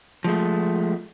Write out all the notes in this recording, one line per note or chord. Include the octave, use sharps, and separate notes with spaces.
F3 G#3 A3